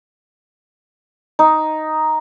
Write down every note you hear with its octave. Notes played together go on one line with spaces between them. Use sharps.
D#4